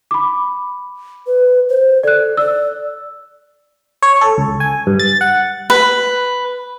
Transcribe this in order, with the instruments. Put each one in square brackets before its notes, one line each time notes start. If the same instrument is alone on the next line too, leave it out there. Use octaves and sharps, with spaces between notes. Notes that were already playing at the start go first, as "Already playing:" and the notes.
[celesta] B5 D6
[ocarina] B4
C5
[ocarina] A4 [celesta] D5 F#6
[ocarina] D5 [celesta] E6
[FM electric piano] C#5
A4
C#2
G#5
G2
A6
F#5
[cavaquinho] B4